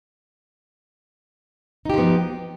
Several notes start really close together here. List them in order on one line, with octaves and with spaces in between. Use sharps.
D#4 G4 F3 B3